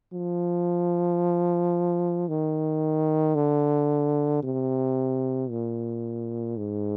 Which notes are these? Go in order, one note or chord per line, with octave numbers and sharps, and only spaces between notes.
F3
D#3
D3
C3
A#2
G#2